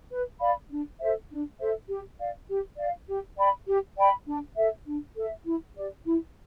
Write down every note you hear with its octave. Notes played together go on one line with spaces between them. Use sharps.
B4
D5 F5 B5
D4
A4 C5 E5
D4
A4 C5 E5
G4
D5 F5
G4
D5 F5
G4
D5 G5 B5
G4
D5 G5 B5
D4
A4 E5
D4
A4 E5
E4
G4 D5
E4